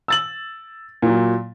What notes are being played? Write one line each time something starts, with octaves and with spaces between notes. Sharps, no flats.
E6 A6 F#7
A#2 F#3